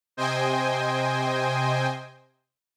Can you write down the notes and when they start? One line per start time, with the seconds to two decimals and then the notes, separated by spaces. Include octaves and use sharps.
0.17 C3 C5 D#5 G5 G#5